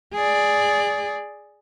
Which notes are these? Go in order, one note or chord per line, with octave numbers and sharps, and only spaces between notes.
G#4 D5